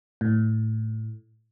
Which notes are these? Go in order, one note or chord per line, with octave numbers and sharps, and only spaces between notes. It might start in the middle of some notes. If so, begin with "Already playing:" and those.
A2